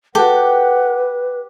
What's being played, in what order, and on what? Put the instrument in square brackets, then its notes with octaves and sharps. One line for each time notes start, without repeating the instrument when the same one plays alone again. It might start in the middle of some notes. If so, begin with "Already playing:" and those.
[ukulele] F#4 A4 [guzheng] G4 [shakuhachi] B4 [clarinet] F#5